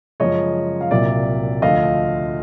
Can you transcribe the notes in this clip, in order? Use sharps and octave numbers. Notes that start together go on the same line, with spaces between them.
F#2 C#3 F3 G#3 C#5 D#5
F5
C2 A#2 F#3 A#3 D5 E5
D2 D3 F3 A3 D#5 F5